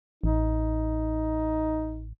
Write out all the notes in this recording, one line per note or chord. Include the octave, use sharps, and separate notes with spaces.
A1 D#4